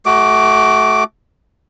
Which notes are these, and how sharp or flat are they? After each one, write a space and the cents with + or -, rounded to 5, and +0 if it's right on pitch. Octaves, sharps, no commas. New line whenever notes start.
A3 -20 F#4 +20 D6 +0